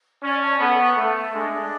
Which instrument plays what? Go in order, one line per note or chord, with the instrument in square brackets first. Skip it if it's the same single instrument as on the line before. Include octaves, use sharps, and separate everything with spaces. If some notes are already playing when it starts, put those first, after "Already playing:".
[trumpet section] C#4 [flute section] D5
[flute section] A5
[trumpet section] B3 [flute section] A4
[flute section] C#6
[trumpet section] A3 [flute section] A4
[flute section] E5
[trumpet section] G#3 [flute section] D4
[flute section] D4